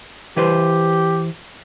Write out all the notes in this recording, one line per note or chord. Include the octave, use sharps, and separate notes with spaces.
E3 G4 B4 C5